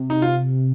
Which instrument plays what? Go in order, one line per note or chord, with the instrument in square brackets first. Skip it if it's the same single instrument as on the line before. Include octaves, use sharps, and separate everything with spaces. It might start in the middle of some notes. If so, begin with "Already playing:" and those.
Already playing: [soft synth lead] C3
[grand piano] D#4
F4